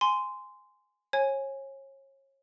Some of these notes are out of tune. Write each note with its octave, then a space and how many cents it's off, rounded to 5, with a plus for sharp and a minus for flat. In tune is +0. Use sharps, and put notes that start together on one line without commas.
G#5 +0 C6 -15
C#5 -30 G#5 +0